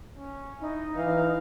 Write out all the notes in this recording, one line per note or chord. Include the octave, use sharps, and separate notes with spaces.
C#4
D#4 E4
E3 F5